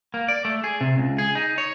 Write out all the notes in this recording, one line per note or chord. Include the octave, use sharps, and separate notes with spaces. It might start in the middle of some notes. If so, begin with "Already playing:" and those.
A#3
D5
A3
G#4
C3
C#2
G#4
D#4
C#5